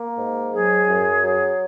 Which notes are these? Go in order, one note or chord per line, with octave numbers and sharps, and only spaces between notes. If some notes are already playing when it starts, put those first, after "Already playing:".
Already playing: A#3
G#2
F#3 G#4
F#2
F#3